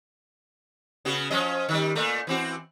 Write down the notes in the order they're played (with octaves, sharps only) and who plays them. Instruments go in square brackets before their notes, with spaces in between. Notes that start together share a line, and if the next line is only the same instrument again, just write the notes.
[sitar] C#3 B3 F#4
F3 C#4 D#5
D#3 G3
A#2 A3
E3 C4 F#4